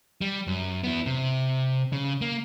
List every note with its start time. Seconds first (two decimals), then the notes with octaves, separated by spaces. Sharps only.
0.21 G3
0.47 F#2
0.84 B3 E4
1.06 C3
1.93 C#3
2.21 A#3